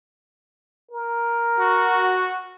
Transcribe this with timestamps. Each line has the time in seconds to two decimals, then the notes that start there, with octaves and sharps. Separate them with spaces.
0.91 A#4
1.58 F#4